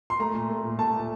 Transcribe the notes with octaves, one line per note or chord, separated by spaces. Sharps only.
C6
A3 A#5
A#2
A3
A#2
A3 A5
A#2